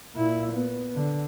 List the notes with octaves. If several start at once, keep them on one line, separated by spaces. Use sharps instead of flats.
A#2 E4
B3
D3